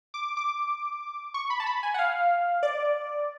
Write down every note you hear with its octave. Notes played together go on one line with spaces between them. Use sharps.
D6
D6
C#6
B5
A5
B5
G#5
F#5
F5
D5